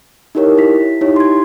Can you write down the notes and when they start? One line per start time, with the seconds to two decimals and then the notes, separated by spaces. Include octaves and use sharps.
0.35 D#4 E4 G4 A#4 C#5
0.58 E4 B6
1.01 D#4 E4 G4 C#5
1.16 C6 G#6